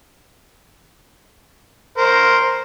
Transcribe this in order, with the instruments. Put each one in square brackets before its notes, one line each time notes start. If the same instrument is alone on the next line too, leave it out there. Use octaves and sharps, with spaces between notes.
[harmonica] A#4 C5